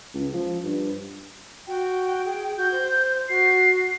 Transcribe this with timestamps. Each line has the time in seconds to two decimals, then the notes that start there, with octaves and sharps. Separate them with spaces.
0.14 C#2
0.34 F3
0.64 G2
1.67 F#4 G5
2.25 G#4
2.58 F#4 G6
2.72 C5
3.29 F#4 C7